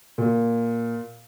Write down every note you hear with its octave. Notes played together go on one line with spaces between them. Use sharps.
A#2